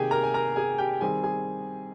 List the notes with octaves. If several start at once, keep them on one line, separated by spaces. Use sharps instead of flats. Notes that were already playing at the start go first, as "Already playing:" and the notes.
Already playing: C3 D#3 A#3 G4 G#4 G5 G#5
A#4 A#5
G#5
A#4 A#5
G#4 G#5
G4 G5
D#3 G3 C4 G#4 G#5
G#4 G#5